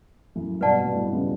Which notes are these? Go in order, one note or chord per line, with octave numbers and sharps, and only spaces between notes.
F#2 A2
G2 B2 B4 D5 F#5 A5
G2
A2
B2
A2 C#3